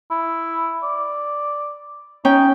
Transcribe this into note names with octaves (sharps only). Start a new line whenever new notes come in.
E4
D5
C#4 D#4 G5